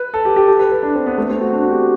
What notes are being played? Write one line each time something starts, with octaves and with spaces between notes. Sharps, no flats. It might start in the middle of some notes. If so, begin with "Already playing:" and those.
Already playing: B4
A4
G4
G4
A4
B4
B4
D4
C4
B3
A3
C4
F#4
D4
F#4
G4